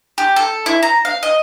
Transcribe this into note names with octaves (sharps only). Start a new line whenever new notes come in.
G4
A4
E4
A#5
F5
D#5